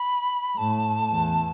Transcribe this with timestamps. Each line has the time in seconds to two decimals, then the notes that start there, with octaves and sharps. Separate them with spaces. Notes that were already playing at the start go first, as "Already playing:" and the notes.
Already playing: B5
0.57 A2 A5
1.10 E2